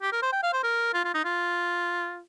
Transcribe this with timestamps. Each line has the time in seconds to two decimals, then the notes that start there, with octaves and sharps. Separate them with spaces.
0.02 G4
0.12 A#4
0.22 C5
0.32 G5
0.43 F5
0.53 C5
0.63 A#4
0.93 F4
1.04 F4
1.14 D#4
1.24 F4